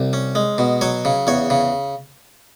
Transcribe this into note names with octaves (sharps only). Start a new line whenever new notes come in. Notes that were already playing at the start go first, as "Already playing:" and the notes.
Already playing: C2
C#4
G#3
B2
F#3 C#5
C#3
E2 C#5
C#3